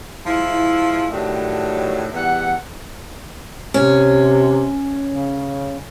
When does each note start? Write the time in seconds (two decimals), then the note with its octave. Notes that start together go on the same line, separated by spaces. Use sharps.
0.26 F3 G#3 E4
1.10 A2 D#3 F#3 D4 G4
2.13 E2 G3 F#5
3.74 C3 C#4
5.08 C#3